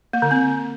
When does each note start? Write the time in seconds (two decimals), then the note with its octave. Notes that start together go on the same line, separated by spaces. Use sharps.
0.13 A#3
0.22 D3
0.31 C4